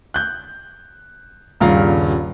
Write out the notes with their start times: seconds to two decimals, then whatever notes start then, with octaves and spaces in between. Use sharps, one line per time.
0.14 F#6 G6
1.60 D#1 G2 C#3 F4 A#5